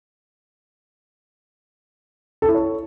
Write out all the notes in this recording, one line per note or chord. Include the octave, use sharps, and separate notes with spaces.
A4
E4
C#5